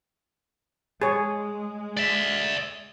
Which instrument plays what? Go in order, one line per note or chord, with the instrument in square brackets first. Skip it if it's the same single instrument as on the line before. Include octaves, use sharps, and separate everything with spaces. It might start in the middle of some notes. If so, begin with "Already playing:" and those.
[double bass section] G#3 [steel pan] G#4 C#5
[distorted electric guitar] D5 E5